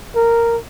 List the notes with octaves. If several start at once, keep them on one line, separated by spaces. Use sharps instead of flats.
A#4